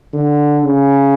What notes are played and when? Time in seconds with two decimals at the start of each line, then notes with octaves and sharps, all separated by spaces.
0.13 D3
0.65 C#3